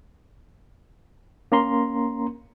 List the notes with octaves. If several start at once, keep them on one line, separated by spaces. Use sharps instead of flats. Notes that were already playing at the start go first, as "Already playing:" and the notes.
A#3 C#4 A#5 C6